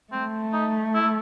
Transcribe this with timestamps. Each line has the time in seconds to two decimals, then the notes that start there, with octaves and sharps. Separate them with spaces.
0.12 A3 C4
0.53 D#4
0.95 E4